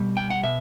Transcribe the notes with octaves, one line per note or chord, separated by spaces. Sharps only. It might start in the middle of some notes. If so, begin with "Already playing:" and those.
Already playing: B2 G3
G5
F#5
B2 E5